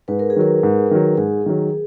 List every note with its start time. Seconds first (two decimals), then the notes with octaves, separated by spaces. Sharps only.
0.08 G#2 B4
0.19 A#4
0.30 G#4
0.36 D#3 F#3 A#4
0.63 G#2
0.91 D#3 F#3
1.18 G#2 G#4
1.46 D#3 F#3